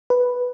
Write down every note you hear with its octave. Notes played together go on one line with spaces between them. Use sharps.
B4